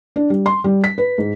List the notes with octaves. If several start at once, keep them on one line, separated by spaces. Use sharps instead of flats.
D4
G3
C6
G3
B6
B4
G#2